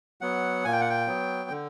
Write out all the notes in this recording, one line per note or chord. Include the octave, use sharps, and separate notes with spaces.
F#3 B3 F#5
A#2 G#5
G5
F#5
G5
F#3 B3
D3